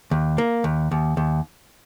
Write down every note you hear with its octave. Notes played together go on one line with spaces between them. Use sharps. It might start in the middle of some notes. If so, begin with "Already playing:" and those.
D#2
A#3
D#2
D#2
D#2